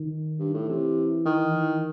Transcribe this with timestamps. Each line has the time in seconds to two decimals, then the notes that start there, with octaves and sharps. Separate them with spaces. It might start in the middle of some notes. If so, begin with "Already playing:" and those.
Already playing: D#3
0.39 G2
0.54 A2
0.68 C3 E3
1.26 D#3
1.53 E3